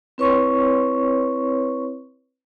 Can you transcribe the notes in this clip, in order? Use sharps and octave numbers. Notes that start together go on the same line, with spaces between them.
C4 E4 B4 C#5 C6 C#6